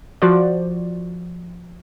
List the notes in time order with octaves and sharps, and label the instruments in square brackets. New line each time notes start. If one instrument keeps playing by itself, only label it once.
[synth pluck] F3 F#4 C5 D5